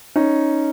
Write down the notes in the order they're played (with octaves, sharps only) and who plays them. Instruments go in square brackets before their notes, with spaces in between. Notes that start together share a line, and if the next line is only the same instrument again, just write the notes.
[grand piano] C#4 D#4